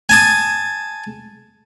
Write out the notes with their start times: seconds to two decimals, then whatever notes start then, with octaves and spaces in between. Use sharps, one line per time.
0.09 G#5 A5 D#6